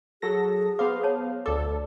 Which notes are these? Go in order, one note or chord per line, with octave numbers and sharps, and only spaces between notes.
F#3 G#4 A4 A#6
B3 C5 F5 D6
C#5 A5
D2 A4 D5 D6